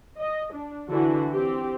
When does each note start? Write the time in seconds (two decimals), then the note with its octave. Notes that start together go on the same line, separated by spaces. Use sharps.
0.18 D#5
0.53 D4
0.88 D3 E3 F#4
1.32 C4 G4